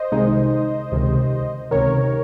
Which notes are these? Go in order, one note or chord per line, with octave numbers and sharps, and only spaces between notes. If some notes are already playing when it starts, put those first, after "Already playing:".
Already playing: C5 D#5
C2 C3 D#3 G#3 D#4
C#2 C3 D#3
C#2 C3 D#3 A#4 C#5